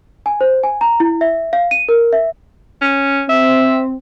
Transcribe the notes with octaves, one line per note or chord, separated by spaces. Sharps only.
G#5
C5
G#5
A#5
E4
E5
F5
D#7
A#4
E5
C#4
C4 E5